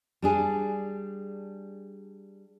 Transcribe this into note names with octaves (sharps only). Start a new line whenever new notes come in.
G3 D4 G#4